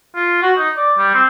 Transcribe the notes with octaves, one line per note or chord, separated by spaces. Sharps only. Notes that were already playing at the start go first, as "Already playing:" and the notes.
F4
F#4
D#4
D5
G3
C4